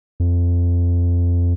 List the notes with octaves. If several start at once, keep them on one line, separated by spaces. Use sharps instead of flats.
F2